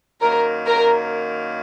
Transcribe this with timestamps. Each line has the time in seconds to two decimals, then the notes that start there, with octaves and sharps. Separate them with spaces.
0.21 F#2 D#3 A#3 A#4
0.67 A#4